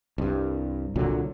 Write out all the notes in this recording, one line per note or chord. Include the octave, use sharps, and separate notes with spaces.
C2 G2
C2 A#2 D3 F#3